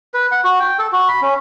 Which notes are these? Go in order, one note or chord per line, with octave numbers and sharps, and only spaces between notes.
B4
F#5
F#4
G5
A4
F#4
B5
C#4